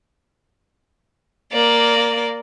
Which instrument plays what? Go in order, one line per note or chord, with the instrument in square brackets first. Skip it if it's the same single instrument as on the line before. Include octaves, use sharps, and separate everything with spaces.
[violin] A#3 D5